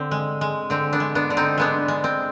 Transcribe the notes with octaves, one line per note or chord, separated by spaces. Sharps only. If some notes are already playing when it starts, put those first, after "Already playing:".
Already playing: D3 C4
G#3
G#3
D3 C4
B3 D4
G#3
B3 D4
D3
C4 D#4
G#3 B3 D4
G#3
C4